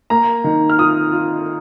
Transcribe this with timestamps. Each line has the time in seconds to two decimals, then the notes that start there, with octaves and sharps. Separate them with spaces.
0.10 A#3 A#5
0.44 D#3
0.70 F6
0.78 F4 D#6
1.12 F4